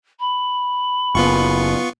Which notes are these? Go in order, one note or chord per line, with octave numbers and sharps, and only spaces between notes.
B5
F#1 B3 F4 C#6